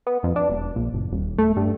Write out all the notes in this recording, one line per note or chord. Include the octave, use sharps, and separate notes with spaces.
B3
F2
D4
E1
A#1
F#1
D#1
A3
G2